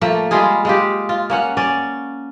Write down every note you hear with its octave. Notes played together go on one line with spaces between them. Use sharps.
F3 A3 A#3
G3 G#3 F4 G#4
G#3 F4 G4
F4
A#3 C#4 F#5
C#4 D5